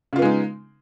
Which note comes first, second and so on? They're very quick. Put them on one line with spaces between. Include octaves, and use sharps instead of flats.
C#3 F4 B3 G#3 D#4